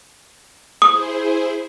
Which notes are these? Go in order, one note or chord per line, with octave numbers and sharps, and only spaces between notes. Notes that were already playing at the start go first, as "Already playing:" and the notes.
E4 G#4 C5 D#6